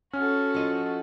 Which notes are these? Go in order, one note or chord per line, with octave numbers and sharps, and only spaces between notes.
C#4 F#4 A4 F6
F3 D#5